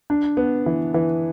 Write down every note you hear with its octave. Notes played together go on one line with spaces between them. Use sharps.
D4
B3
E3
E3